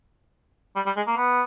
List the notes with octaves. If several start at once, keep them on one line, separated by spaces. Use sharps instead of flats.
G3
G3
G#3
A#3
B3